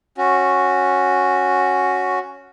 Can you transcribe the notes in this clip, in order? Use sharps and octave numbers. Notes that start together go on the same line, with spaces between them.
C#4 F#4